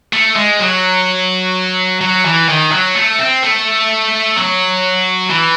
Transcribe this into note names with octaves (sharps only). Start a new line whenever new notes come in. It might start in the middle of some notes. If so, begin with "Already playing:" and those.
A3
G#3
F#3
F#3
E3
D#3
F#3
A3
C4
A3
F#3
E3